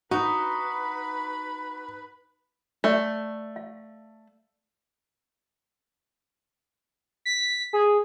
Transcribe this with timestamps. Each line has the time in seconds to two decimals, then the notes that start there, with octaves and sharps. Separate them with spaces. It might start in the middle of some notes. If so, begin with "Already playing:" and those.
0.11 D#4 F#4 B4 B5
2.84 A3 D5 E5 F5
3.56 F5
7.25 B6
7.73 G#4